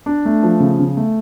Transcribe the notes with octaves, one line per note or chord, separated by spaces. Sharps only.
D4
A3
F3
C#3
C#3
A3